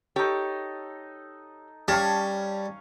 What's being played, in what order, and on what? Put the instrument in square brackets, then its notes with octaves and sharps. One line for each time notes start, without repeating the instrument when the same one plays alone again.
[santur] D#4 A4 [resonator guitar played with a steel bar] G4 C#5
[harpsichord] G3 [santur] C#4 F5 C#6 [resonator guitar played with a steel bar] A5